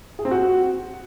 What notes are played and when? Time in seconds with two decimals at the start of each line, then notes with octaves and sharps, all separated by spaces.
0.19 G#4
0.25 C4
0.31 F#4